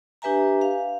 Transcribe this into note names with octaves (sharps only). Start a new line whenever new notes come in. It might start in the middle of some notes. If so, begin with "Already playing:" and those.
D4 G4 B4 E5 G#5 A#5
F5